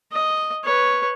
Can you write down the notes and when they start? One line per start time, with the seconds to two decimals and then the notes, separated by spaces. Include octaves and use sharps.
0.12 D#5
0.64 B4 C#5